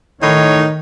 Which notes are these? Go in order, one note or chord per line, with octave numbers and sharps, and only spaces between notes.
A2 D#3 D#4 C#5